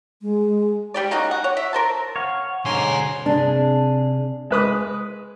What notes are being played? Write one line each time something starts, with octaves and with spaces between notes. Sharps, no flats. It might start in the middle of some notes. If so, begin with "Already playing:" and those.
G#3
G3 G4 D5
A#3 C#4 D#4 F#4
F#5
C#5
E5
A#4 C5 A5
C#5 F5 F#5
B1 G#2 D3 A#4 C#5 G#5 C6
C3 D4 G#4
G#3 B4 D#6